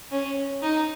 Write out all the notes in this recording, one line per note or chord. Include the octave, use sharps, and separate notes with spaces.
C#4
D#4